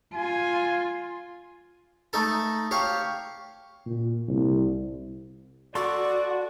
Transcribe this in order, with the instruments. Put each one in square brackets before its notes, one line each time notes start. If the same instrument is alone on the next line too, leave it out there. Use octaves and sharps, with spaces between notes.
[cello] F4 [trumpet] G#5
[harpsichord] A3 D#4 A4 A5
G4 C#5 F5
[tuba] A#2
C2
[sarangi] F#4 [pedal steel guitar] A4 C6 C#6 [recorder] D5